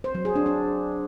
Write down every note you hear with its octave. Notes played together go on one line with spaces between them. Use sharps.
C5
F#3
G#4
D4
D4